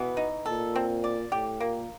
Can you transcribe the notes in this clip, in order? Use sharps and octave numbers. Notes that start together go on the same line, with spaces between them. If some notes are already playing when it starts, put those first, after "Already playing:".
Already playing: B2 E3 B3
D#4
A#2 A4
C4
D5
A2 G4
A#2 A#3